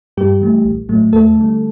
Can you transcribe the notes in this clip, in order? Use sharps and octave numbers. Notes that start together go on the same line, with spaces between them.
G2 G3 G4
E3 A3
A#1
A2 F#3 A3
D#2 A3 A4
D3 G3